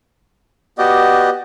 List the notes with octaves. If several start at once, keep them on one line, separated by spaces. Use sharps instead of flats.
B3 F#4 G4 D5 D#5